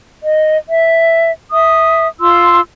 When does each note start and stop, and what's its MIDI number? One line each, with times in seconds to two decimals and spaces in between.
0.22 0.56 75
0.68 1.30 76
1.51 2.08 76
1.51 2.08 87
2.20 2.60 65
2.20 2.60 84
2.20 2.60 88